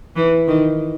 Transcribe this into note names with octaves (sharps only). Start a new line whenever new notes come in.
E3
D#3